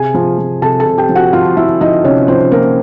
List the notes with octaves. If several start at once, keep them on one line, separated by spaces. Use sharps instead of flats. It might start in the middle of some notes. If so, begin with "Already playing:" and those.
Already playing: C3 G#4 G#5
F3
F3
C3 A4 A5
A4 A5
C3
G4 G5
F3
F#4 F#5
F3 F4 F5
F3 E4 E5
F3 D#4 D#5
C3 C#4 C#5
F3 C4 C5
F3 A#3 A#4